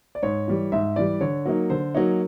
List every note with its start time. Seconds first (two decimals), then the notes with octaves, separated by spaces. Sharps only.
0.15 D5
0.23 G#2 C#5
0.48 E3 G3
0.72 G#2 E5
0.96 E3 G3 D5
1.21 D3 C#5
1.45 F#3 A#3 D#4
1.70 D3 C5
1.94 F#3 A#3 D#4 C#5